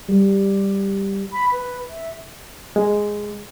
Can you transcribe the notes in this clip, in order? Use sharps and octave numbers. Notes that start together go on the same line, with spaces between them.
G3
B5
B4
E5
G#3